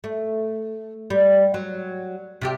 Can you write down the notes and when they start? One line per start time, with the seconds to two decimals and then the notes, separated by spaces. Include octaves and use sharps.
0.04 A3
1.10 G3
1.54 F#3
2.41 C3 F4 G4